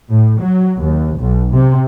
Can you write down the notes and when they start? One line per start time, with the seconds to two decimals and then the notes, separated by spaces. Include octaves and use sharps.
0.10 A2
0.41 F#3
0.78 D#2
1.19 B1
1.54 C3